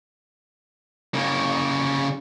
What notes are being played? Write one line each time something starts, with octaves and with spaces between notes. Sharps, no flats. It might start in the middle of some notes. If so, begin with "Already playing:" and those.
C#3 A#3